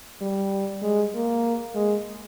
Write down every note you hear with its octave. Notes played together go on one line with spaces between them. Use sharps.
G3
G#3
A#3
G#3